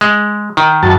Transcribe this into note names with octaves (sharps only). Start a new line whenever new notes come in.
G#3
D#3
F#2 A5